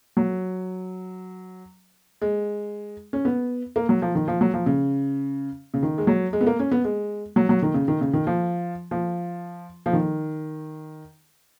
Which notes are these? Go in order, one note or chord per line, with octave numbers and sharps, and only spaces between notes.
F#3
G#3
C#4
B3
A#3
F#3
F3
D#3
F3
F#3
F3
C#3
C#3
D#3
G#3
F#3
G#3
B3
A#3
C#4
B3
G#3
F#3
F#3
D#3
C#3
D#3
C#3
D#3
F3
F3
F3
D#3